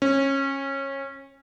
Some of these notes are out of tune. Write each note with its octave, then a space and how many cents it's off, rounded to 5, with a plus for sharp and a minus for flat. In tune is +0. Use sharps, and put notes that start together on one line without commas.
C#4 -20